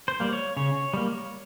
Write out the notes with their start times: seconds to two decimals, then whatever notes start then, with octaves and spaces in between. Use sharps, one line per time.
0.08 C5
0.20 G3 A#3
0.33 C#5
0.57 C#3 C#5
0.94 G3 A#3